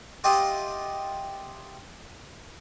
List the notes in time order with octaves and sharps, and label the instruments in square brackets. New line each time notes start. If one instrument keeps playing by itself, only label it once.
[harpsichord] F4 G4 D#5 E5 F#5